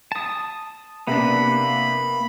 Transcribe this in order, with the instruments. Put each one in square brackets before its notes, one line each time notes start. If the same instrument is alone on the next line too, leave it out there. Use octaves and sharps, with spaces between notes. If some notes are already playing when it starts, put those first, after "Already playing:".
[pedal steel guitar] A5 D#6
[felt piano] C3 D4 [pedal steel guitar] A#3 B3 [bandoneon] B5